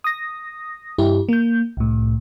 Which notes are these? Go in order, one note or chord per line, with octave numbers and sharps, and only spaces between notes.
D#6 A#6
G2 E4 G4
A#3 G6
C2 A2